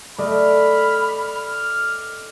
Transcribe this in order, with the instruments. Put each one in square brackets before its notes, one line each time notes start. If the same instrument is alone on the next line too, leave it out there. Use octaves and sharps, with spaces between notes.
[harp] A3 [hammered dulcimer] D5 D#5 C#6 [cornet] B5 [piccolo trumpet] F6